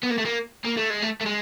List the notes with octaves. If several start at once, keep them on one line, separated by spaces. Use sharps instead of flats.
B3
A#3
A3
A#3
A#3
A3
G#3
A3
A3
G#3